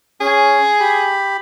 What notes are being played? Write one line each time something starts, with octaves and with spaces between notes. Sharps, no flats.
C#4 G#4
G4 B5